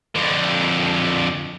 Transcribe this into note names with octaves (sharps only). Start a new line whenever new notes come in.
F2 D3